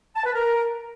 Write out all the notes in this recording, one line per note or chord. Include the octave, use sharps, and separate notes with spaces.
A5
B4
A#4